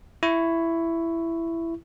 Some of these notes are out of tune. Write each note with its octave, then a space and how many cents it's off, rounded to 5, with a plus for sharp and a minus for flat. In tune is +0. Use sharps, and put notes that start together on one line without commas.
E4 +10 C#6 +0